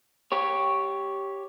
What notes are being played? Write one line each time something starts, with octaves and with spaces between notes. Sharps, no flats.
G4 C#5